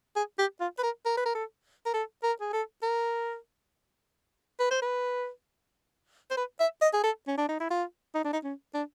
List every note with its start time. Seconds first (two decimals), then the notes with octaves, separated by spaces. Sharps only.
0.16 G#4
0.39 G4
0.61 F4
0.79 B4
0.83 A#4
1.05 A#4
1.17 B4
1.26 A#4
1.35 A4
1.86 A#4
1.94 A4
2.23 A#4
2.41 G#4
2.53 A4
2.82 A#4
4.60 B4
4.71 C5
4.82 B4
6.31 C5
6.37 B4
6.60 E5
6.82 D#5
6.93 G#4
7.04 A4
7.27 C#4
7.38 D4
7.49 D#4
7.60 E4
7.70 F4
8.14 D#4
8.24 D4
8.33 D#4
8.44 C#4
8.74 D4